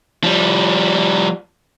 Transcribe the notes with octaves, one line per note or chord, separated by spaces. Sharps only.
F3 G3